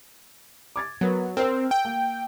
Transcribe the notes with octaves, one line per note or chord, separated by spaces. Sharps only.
D6 G#6 A6
F#3 B3 A#4 B4
C4 A#4 C5 E6
G5
A#3